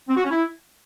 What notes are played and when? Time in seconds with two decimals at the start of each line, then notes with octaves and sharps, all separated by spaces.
0.08 C4
0.15 F#4
0.23 C#4
0.30 E4